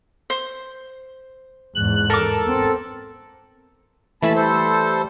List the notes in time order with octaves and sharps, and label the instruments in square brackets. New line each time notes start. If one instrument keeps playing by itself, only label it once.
[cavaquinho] C5
[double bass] E2 G#2 [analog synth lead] F#6
[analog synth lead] A4 [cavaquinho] A#4 D6
[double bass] B3 C4
[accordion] D#2 A5 B5 [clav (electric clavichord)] E3 A3 E4
[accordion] G3 A4 C5